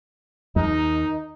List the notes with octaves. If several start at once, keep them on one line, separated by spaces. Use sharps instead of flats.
D#2 D#4